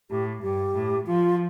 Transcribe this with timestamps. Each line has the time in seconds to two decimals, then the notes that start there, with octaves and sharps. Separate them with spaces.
0.10 A2 G4
0.43 G2 G4
0.74 A2
1.07 F3 F4